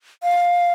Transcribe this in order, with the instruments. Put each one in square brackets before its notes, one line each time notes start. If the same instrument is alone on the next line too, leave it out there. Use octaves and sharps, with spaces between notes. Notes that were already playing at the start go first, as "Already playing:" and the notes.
[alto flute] F5